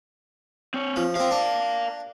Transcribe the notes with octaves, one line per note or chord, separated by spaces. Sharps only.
C4 C#5
F3
F3 C4 A#4 F5
D4